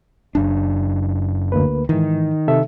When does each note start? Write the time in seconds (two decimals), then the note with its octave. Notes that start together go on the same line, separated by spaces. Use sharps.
0.35 F#1 F#2 D4
1.52 D2 A#3 B4
1.89 G#2 D#3 E3
2.48 C3 A4 E5